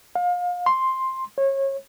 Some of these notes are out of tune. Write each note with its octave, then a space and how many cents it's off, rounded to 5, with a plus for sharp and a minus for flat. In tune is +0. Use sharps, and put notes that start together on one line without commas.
F5 +30
C6 +5
C#5 -30